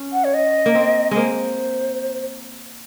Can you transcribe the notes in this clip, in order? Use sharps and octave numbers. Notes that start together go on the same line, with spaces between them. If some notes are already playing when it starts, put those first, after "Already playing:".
Already playing: C#4
F#5
C#5
D#5
A#3
C4
G#3 A#3 C5